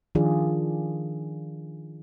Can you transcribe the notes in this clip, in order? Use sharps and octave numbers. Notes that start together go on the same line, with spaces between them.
D#3 F3 D4 F4 G#4 D5